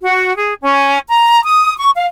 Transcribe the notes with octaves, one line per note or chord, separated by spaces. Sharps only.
F#4
G#4
C#4
A#5
D#6
C#6
F5